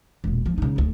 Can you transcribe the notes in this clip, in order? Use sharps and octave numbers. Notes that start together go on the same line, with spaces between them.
E1 A#2
F3
C#3 D#4
D1 D2